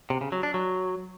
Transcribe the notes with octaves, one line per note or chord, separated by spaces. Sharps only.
C3
C#3
F#3
D4
F#3